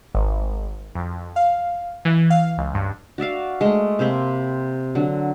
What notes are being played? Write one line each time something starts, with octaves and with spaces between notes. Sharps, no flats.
G#1
F2
F5
E3
F5
C#2
G2
F#4 D5 E5 F5
G#3 A3
C3 A#3 C4 B5
D3 F#3